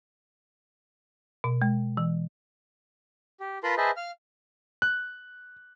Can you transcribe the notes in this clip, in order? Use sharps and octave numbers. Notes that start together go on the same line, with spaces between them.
B2
G#3
E3
G4
F4 A#4 B4 A5 B5 C6
G#4 B4 C5 D#5 E5 A5
F5 F6
F#6